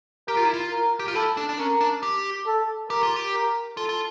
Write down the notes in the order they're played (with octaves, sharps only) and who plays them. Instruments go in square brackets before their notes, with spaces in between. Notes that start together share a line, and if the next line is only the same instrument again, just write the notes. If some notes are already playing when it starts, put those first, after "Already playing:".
[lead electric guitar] G4 [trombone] A#4
[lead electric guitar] F4
E4
F4
[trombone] A#4
[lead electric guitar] G4
F4
[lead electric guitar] E4 [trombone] A4
[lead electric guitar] D4
D4
[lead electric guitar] C#4 [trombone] A#4
[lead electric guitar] D4
G4
[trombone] A4
[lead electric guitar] G4 [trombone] A#4
[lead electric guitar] F4
G4
[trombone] A#4
[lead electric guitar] F4 [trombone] A4
[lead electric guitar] F4